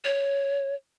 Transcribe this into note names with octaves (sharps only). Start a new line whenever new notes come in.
C#5